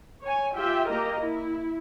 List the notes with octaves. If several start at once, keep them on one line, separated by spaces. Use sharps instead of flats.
C#5 G#5
F4 G4 E5 G5
A#3 G4 A#4 D#5
E4